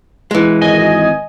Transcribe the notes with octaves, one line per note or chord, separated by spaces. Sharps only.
E3 G#3
G#1 D#5 G#5